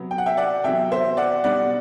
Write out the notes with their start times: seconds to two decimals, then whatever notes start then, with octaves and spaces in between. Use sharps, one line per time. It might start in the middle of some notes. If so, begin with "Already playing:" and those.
Already playing: C3 F#3 B3
0.11 G5
0.18 F#5
0.26 E5 G5
0.37 D5 F#5
0.64 E2 C3 F#3 E5 G5
0.92 C5 E5
1.17 D5 F#5
1.44 B2 G3 D4 D5 F#5